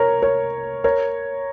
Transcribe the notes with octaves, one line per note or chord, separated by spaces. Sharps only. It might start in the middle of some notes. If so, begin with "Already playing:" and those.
Already playing: A#4 C#5
A#4 C#5
A#4 C#5